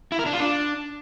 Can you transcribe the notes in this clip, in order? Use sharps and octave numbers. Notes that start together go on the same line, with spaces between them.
E4
A#4
D4
F4
D4